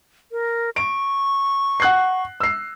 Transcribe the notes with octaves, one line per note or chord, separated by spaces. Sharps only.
A#4
C#6 D7
F#5 F#6 C7
E6 C7